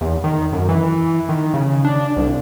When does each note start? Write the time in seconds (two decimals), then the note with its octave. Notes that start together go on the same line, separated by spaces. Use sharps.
0.01 E2
0.24 D#3
0.52 F#2
0.69 E3
1.29 D#3
1.54 C#3
1.85 D4
2.16 C2